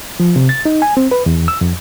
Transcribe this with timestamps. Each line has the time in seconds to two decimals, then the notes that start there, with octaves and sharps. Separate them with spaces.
0.20 F3
0.36 C3
0.49 A6
0.65 D#4
0.82 G#5
0.97 C4
1.11 B4
1.26 E2
1.48 E6
1.61 F2